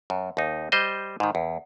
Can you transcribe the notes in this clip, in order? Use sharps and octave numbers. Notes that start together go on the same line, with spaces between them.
F#2
D#2 D#4
G3 C5 D#5
G#2 D#3
E2